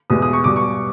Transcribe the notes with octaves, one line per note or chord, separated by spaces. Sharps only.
E2 B2 G#3 D#6
D#6
C#6
B2 G3 D6
C#6